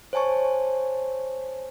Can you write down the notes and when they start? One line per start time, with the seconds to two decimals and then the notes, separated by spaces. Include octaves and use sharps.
0.13 C5 C#5 G#5 A5 C#6